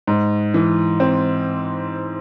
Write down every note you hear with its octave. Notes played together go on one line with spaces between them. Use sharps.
G#2
E3
C4